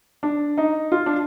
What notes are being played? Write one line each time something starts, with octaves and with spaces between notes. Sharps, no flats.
D4
D#4
F4
D4